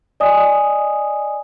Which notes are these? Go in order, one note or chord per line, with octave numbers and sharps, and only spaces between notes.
D5 D#5 G#5 D#6